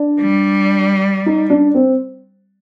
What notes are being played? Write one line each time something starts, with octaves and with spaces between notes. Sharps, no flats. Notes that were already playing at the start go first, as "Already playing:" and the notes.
Already playing: D4
G3
D#4
D4
C4